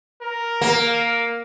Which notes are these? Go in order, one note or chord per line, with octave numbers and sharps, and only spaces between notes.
A#4
A#3